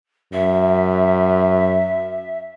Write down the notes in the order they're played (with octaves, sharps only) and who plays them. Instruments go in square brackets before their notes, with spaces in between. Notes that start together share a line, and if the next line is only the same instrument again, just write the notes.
[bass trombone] F#2 [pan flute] E5